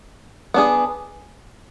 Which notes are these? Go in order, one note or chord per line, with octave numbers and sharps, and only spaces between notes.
B3 D4 G#4